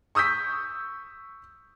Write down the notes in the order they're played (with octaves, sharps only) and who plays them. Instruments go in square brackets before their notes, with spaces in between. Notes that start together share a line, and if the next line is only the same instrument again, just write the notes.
[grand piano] C#6 D#6 E6 G6 B6